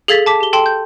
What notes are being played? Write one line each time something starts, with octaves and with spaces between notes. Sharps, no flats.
G#4 A4 F5 G#6 A6 B6
A5 D6 B6
G4 G7
A4 G5 A5 C6
G6